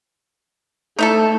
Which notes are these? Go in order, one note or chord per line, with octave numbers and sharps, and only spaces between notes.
A3 D#4 E4 A4